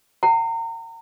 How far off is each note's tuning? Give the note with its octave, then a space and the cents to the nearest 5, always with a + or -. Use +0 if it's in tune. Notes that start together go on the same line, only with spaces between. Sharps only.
F#5 +30 A#5 -35